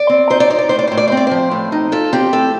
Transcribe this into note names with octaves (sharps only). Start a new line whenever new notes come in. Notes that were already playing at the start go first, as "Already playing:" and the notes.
Already playing: D5
C4
D#4 C5
D5
D#4 C5
D5
A2 C5
D5
A2 C5
D5
C5
C4
D5
F3 C5
A2
D#4
F3 A4
C4 G4
A2 A4